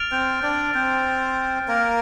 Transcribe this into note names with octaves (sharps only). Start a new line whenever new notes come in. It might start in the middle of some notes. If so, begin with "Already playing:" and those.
Already playing: F6 A6 D7 F7
C4 C5
D4 D5
C4 C5
A#3 A#4